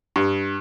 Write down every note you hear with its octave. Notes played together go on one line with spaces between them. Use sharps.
G2